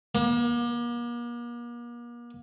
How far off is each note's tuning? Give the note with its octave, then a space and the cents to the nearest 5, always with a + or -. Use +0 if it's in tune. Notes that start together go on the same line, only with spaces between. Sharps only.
A#3 +40